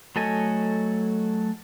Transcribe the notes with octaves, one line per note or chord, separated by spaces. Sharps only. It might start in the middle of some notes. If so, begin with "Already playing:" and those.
F#3 A3 A4 D#5 G#5